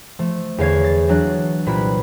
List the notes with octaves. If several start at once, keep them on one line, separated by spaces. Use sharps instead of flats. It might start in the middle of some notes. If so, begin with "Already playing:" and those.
F3 A3
E2 D3 C#5 F5 C#6 G#6
A6
E3 F#3 D4 F#6 A6
C2 A#2 E4 B4 B5